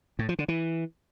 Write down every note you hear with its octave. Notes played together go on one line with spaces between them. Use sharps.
A2
F3
D3
E3